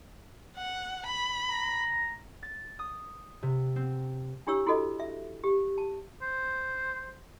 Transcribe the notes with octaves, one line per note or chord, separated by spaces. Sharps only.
F#5
B5
A#5
A6
D#6
C3
C4
D4 E4 G4 C#5 E6
E4 F#4 A4 D#5
E5
G4
A5
C5